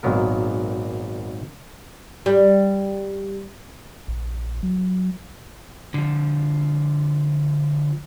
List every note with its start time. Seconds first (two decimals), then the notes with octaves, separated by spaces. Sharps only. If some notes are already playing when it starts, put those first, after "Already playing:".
0.03 G#1 A#2 D#3 F#3 B3 A#4
2.26 G3
4.08 A#1
4.63 F#3
5.94 D3 F3